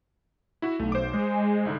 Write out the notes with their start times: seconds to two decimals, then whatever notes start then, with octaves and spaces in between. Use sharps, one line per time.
0.62 E4 F#4
0.79 B1 A3
0.92 C5 D6
1.14 G#3
1.65 C2 G#2 D3